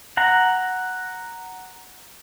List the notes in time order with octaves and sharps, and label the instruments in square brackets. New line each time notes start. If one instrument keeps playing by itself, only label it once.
[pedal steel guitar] F#5 A#5